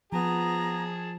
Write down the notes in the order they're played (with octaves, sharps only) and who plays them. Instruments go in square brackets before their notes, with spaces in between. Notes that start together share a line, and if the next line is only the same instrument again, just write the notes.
[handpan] F3 [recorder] B3 [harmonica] G#4 A5 [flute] A#5